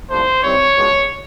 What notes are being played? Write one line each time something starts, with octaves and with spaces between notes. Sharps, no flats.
C2 C3 F3 A3 D4 C5
C3 D#3 G3 C4 E4 C#5
C#2 B2 G#3 B3 D4